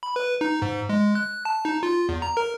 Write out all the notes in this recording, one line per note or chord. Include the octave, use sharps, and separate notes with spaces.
B5
B4
D#4
G#2
G#3
F#6
A5
D#4
F4
E2
A#5
A#4